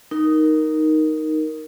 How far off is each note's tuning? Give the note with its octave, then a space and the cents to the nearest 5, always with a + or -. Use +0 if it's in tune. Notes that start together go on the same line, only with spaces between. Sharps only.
D#4 +0 A#4 +0